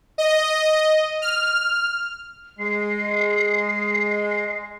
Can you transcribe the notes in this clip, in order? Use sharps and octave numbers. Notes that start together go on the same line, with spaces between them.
D#5
F6
G#3 C7